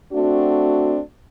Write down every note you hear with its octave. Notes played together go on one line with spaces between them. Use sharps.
A3 C4 D4 F#4